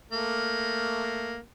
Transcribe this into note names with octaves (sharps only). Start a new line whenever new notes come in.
A3 A#3